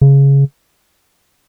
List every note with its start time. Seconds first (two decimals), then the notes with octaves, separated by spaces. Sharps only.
0.01 C#3